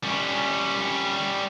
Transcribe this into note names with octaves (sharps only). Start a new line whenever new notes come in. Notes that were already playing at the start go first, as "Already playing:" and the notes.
G3 C#4